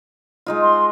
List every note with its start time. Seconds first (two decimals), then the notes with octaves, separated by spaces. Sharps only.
0.46 G#3 D#4 F4
0.62 C6